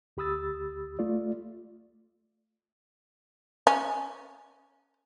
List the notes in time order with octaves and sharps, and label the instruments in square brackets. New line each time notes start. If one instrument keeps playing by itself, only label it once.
[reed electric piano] D2 G4 B5 D#6 E6 A6
A3 F4 D5
[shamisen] C#4